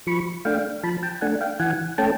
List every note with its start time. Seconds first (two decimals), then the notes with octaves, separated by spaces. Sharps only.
0.07 F3 B5 C#6
0.45 A3 D4 F5 G5
0.83 F3 A5 B5
1.03 G5 A5
1.21 A3 D4 F#5 G#5
1.41 F5 G5
1.60 E3 F#5 G#5
1.98 A3 C#4 G5 A5